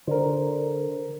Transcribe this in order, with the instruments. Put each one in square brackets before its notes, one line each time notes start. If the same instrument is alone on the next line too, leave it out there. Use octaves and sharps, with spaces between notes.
[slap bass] D3 [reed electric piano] A#4 C5